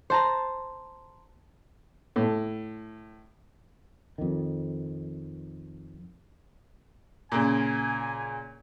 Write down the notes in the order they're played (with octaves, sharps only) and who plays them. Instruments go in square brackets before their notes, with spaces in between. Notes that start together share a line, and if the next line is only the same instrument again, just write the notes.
[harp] C5 A5 A#5
[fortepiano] A2
[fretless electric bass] F2 D#3
[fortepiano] A#2 C#3 [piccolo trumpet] G#5